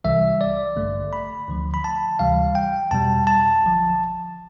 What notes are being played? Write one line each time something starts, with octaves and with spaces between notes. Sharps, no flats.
C2 C3 E3 G3 E5
D5
A1 G2 D3 A3
B5
D2 D3 F3 A3
B5
A5
D2 C3 E3 G3 F5
G5
E2 B2 G3 A5
A5
A1 D3 F3